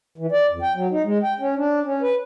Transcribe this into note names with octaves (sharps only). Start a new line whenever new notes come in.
E3
D5
F2
G5
F#3
D#4
G#3
G5
C#4
D4
C#4
B4